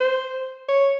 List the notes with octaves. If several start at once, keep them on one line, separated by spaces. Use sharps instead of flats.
C5
C#5